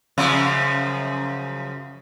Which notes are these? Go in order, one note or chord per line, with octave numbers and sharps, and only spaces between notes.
F#2 C#3 F3